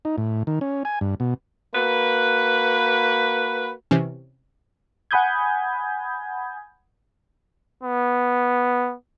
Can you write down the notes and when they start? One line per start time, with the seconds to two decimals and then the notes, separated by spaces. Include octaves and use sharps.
0.05 D#4
0.18 A2
0.47 D#3
0.61 C#4
0.85 G#5
1.01 G2
1.20 B2
1.74 A#3 F#4 B4
3.91 C3 E3 C#4
5.11 F#5 G#5 B5 D#6 G6 G#6
7.83 B3